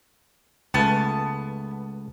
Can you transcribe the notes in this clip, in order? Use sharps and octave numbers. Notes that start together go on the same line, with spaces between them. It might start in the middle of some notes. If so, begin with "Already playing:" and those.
C#2 A3 B3 A5